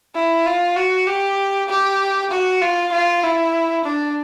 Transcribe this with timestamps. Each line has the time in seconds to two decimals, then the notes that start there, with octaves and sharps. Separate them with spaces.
0.15 E4
0.46 F4
0.76 F#4
1.07 G4
1.69 G4
2.31 F#4
2.62 F4
2.92 F4
3.23 E4
3.85 D4